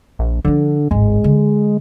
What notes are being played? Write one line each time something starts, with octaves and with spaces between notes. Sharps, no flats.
A#1
D3 F3 D4
D1 G#1 G#3
D3